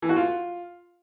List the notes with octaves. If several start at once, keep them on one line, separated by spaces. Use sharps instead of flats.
E3
F#4
F4